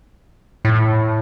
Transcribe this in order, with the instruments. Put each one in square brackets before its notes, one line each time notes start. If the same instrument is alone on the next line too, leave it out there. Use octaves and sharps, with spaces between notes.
[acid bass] A2